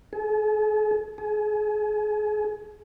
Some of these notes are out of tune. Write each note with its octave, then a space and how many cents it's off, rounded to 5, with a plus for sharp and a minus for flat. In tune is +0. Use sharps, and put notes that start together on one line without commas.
G#4 +45
G#4 +30